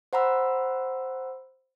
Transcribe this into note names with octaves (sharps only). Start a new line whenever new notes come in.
C5 F#5 A#5 B5 E6